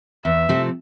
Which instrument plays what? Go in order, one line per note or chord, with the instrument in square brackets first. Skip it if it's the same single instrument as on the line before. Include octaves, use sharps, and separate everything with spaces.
[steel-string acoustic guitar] E2 [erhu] E5
[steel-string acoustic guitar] C3 F3 A3 C4